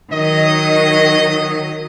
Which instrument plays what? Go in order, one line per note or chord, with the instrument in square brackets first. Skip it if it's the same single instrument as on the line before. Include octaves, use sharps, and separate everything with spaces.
[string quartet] D#3 F#3 [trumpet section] D#5